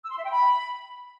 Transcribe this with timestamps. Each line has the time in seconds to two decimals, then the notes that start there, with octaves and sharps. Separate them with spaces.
0.03 E6
0.10 C6
0.17 E5
0.24 G5
0.31 B5